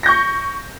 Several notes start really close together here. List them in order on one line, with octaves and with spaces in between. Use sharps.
A#6 G6 C#6